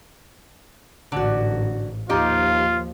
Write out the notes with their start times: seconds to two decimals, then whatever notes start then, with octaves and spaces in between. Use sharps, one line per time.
1.12 A1 G#2 D3 F#4
2.09 D#2 F3 D#4 F4 G4 D#5